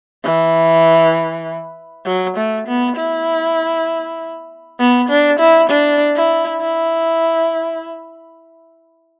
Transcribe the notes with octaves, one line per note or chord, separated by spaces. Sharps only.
E3
F#3
A3
B3
E4
B3
D4
E4
D4
E4
E4